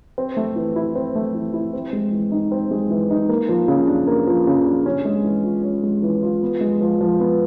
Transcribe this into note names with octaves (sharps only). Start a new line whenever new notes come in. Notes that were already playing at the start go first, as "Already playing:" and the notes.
C4
A3
E3
E4
C4
A3
E3
E4
C4
G#3
E3
D#4
C4
G#3
E3
D#4
A#3
F3
C#3
D4
A#3
F3
C#3
D4
C#4
G#3
E3
F4
C#4
G#3
E3
F4
B3
G#3
F3
F3
B3